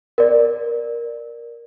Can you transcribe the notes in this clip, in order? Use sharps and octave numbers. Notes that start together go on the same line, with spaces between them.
A#4 D5